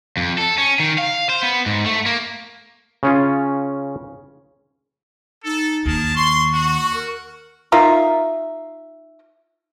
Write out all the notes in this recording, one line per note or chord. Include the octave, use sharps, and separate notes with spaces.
F2
A4
C#4
D#3
F5
C5
B3
G#2
A3
A#3
C#3 C#4 F4
D#4 A4
D#2 G#4 A#4 A5
C6 C#6
F#4
A#4
D#4 F4 A#4 E5